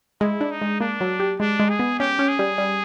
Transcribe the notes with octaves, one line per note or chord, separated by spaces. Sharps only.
G#3 E4
D4
D#4
G#3
A#3 D4
F#3
G4
G#3 D4
G#3
G#4
B3
C#4 G4
C#4
G#4
G3
G3